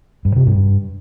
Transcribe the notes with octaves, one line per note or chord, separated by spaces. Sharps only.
G2
C3
G2